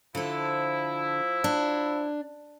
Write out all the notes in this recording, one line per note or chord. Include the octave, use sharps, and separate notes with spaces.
D3 F3 E4 A4
D4